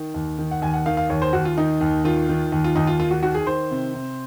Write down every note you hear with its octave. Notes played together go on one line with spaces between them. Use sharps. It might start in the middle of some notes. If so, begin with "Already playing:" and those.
Already playing: D#3
D#2
D#3
F#5
D#2 G#5
F#5
D#3 F5
F5
D#2 C#5
C5
D#2 F#4
F4
D#3 D#4
D#2
D#3 F4
D#3
D#2
F4
D#2 D#4
F4
D#3 F4
F#4
D#3 F#4
G#4
D#3 C5
C3
C3